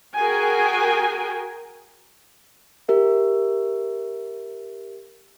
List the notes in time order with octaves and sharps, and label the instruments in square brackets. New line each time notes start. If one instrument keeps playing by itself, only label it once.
[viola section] F#4 G#4 A#4 G5 G#5
[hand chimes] G4 A#4 E5